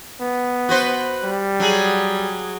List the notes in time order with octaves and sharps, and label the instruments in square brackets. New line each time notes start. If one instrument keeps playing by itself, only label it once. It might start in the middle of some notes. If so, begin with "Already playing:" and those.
[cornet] B3
[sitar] F#4 B4 C5
[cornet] G3
[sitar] F#3 G#4